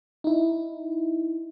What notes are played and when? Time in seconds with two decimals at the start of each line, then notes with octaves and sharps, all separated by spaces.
0.24 D#4 E4